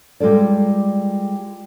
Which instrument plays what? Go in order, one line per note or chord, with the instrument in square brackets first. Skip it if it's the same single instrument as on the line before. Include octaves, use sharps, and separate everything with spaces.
[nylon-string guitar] G3 G#3 F4 A4 D5